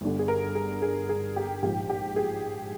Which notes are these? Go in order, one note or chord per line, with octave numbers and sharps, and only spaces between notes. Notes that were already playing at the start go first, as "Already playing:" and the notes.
G1 G2 D3
G#4
A#4
G#4
G#4
G#4
G4
A#1 G#2 F3 G4
G4
G#4